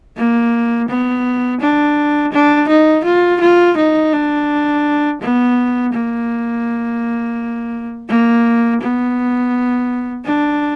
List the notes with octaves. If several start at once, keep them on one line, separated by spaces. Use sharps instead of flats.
A#3
B3
D4
D4
D#4
F4
F4
D#4
D4
B3
A#3
A#3
B3
D4